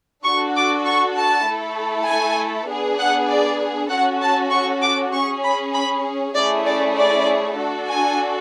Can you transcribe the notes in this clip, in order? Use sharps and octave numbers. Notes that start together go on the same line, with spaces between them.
D4 F#4 A4 C#6
D6
C#6
A5
A3 E4 A4
G#5
B3 D4 G#4
F#5
D5
C#4 F#4 A4 F#5
A5
C#6
D6
C#4 G#4 C#6
B5
B5
A3 C#4 E4 G#4 D5
D5
D5
D4 F#4 A4
G#5